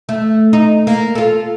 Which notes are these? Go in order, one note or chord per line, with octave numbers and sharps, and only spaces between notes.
A3
D#4
A#3
F4 A4